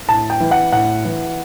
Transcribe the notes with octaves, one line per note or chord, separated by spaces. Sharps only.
A2 A5
G5
E3
F#5
A2 F#5
E3